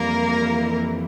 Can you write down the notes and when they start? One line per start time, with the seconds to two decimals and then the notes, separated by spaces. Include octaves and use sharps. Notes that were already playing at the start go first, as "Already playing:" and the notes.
Already playing: F2 E3 G3 A#3 A#4